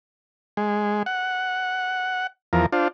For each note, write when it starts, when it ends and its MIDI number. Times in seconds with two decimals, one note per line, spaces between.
0.57 1.03 56
1.06 2.27 78
2.53 2.66 40
2.53 2.66 53
2.53 2.66 70
2.72 2.88 62
2.72 2.88 65
2.72 2.88 72